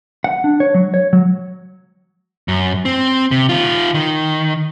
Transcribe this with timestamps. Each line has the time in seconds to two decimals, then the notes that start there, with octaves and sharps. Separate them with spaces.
0.24 F#5
0.44 D4
0.60 C#5
0.75 F#3
0.94 C#5
1.13 F#3
2.48 F#2
2.85 C4
3.31 C3
3.49 D#3 F4
3.94 D#3